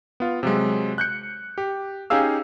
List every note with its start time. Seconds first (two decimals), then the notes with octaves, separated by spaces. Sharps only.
0.20 B3 F4
0.43 C3 F#3 G#3
0.98 F#6 G6 C#7
1.58 G4
2.10 C#4 D#4 G4 G#4 F5 E6